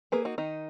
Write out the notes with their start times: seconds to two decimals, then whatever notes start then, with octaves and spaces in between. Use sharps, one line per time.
0.12 A#3 G#4 B4
0.25 D#4 F#4
0.38 D#3 D#4